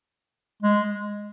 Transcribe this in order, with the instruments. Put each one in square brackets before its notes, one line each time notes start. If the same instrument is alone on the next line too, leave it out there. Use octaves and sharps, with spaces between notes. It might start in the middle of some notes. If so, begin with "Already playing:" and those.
[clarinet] G#3